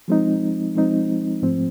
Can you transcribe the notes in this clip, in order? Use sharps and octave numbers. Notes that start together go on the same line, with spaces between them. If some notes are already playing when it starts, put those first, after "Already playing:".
F3 G#3 C4 D#4
F3 G#3 C4 D#4
G#2 F3 A3 C4